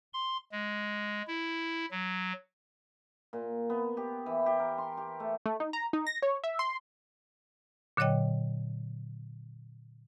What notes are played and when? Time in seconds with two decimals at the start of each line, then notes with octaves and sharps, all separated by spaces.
0.13 C6
0.52 G#3
1.27 E4
1.91 F#3
3.33 A#2
3.70 B3
3.97 G4
4.26 E3
4.46 G4
4.59 A#4
4.78 C6
4.97 G4
5.20 A3
5.46 A3
5.60 D#4
5.73 A#5
5.93 D#4
6.07 A#6
6.22 C#5
6.44 E5
6.59 C6
7.97 A#2 D3 F#3 C#5 D#5 G5